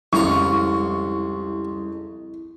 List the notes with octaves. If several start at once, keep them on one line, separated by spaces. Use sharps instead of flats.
C2 F2 G#2 C#3 E4 F4 A#5 C#6